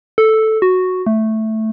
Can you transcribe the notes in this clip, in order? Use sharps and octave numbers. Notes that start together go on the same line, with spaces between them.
A4
F#4
A3